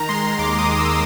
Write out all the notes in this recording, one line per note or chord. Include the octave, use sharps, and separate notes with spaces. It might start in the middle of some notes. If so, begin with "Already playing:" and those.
Already playing: D#3 A#5
G#3 C6
D#2 D6
D#6
G#3
E6